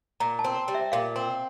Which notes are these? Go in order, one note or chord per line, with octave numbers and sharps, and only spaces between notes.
A#2 A#5
A5
C4
G3
E5
A#2 F5
C4 C6